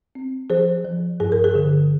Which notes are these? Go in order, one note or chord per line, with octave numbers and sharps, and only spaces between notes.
C4
F3 G#4 C5
F3
G2 G#4
A#4
G#4
D3